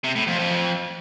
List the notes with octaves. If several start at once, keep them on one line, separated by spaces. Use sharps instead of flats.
C3
A2
F2
F2